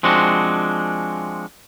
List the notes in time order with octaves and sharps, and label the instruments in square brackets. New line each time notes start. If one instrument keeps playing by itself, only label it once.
[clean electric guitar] F3 G#3 C4 D4 F#4